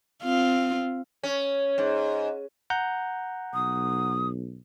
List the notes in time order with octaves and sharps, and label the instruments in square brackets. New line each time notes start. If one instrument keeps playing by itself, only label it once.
[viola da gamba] C4 F4
[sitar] C#4
G#2
[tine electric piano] F#5 A#5 G6
[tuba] B1 [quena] D#6